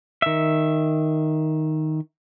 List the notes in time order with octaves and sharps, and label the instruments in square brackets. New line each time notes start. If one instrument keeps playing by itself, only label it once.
[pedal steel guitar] D#3 E5